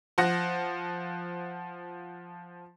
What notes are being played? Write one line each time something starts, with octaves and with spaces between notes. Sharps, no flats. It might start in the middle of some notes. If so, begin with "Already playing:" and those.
F3 F#5 A#6